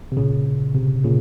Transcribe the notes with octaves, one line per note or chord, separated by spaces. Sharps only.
C3
A#2 C#3
C3
A#2 C#3